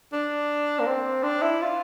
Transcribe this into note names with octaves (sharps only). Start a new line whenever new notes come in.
D4
A#3
C4
D4
E4
F4